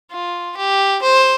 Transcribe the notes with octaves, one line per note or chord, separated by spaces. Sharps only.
F4
G4
C5